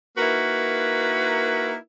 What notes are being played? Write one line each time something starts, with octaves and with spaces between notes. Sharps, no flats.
A#3 D#4 E4 F#4 A#4 B4